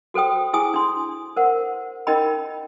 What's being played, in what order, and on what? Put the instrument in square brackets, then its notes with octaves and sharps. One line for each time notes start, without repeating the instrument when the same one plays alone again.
[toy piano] F#4 A4 C5 G5 D#6
E4 G#4 G#5 D#6
D4 C6
A#4 C5 F#5
C#4 D#4 A#4 D#5 G5 B5